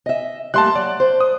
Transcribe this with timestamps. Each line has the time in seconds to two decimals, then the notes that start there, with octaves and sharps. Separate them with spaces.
0.06 D#5 E5
0.54 G3 A3 A#3 A5 C6 F#6
0.75 F#3 D5
1.00 C5
1.21 D#6